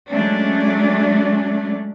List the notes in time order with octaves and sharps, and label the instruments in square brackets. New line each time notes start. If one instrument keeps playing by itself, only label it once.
[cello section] F#3 G#3 A3 C#4 D4